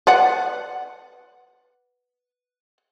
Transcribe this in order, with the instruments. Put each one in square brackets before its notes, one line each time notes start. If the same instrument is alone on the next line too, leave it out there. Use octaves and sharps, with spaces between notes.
[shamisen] B4 D5 F#5